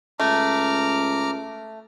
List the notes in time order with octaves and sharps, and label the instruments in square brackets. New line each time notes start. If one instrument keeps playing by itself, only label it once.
[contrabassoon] C#2 [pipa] A3 [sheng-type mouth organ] A#5 D6 F6